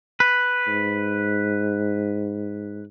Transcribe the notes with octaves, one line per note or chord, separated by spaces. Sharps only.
B4
G#2